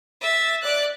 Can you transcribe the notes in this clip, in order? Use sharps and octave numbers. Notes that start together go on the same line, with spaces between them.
E5 A6
D5 F#6